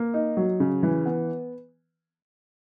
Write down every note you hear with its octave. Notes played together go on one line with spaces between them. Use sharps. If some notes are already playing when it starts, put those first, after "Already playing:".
Already playing: A#3
D#4
F#3
C#3
E3
B3